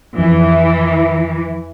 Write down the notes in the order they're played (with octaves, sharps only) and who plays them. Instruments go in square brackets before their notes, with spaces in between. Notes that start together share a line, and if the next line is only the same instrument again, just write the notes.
[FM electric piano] F2 [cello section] E3